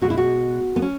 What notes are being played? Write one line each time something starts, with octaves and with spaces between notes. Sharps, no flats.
B2 G#3 F#4
E4
F#4
B3
C#4